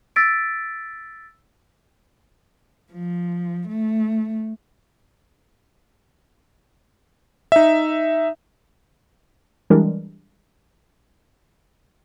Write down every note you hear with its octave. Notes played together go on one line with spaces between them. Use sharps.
E6 A6 B6 D7
F3
A3
D#4 E5
E3 G3 G#3 D4 A#4